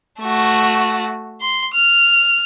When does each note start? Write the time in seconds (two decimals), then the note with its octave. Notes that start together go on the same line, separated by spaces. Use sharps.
0.21 A3 F#4
1.41 C6
1.74 F6